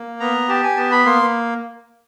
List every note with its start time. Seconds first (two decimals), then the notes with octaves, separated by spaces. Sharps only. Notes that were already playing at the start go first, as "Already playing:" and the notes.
Already playing: A#3
0.20 B3 A#5
0.48 G4 A5
0.64 G#5
0.77 B3 A5
0.91 B5
1.06 A#3 C6